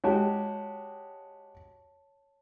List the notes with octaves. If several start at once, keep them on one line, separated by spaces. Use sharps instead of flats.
G#3 F#4 G4 C#5 A5